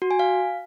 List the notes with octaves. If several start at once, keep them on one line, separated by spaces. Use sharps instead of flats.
F#4
G#5
F5